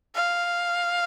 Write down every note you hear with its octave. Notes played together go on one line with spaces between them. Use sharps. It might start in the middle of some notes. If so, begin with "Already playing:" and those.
F5